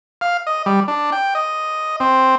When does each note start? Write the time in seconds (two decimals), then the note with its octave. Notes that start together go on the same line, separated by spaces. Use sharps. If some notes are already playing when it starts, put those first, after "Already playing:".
0.21 F5
0.47 D#5
0.66 G3
0.88 D4
1.12 G5
1.35 D#5
2.00 C4